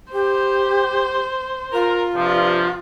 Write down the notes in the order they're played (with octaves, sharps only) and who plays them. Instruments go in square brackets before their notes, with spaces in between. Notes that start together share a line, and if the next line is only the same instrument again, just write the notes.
[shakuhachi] G4 [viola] C5
[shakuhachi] F4 [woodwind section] A#4
[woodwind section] G2 C3 F3